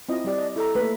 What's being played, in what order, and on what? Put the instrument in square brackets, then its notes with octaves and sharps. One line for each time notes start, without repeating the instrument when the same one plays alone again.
[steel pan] C4 E4 D#5 [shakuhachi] F4
[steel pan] G3 G4 [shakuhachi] D5
[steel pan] D#5
[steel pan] E4 A#5 [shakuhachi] A4
[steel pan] A3 A#3 [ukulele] B4